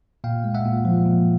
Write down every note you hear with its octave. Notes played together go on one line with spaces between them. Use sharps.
A#2 F5 G5
G#3
E5 F#5
A#2
F3
A#2